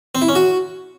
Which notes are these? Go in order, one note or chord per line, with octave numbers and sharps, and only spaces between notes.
C4
E4
C#4
F#4